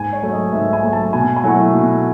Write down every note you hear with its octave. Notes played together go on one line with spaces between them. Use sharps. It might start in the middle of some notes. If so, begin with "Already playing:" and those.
Already playing: G#2 G#5
C#5
F#3 A3
D#5
G#2 E5
G#5
F#3 A3
A5
B2 G#5
G#5
F#3 A3 E4 F#5
B2